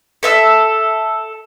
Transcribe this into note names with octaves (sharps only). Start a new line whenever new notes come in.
A4 E5 E6